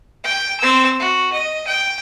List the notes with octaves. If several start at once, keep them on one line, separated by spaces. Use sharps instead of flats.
G5
C4 E6
F#4
D#5
G5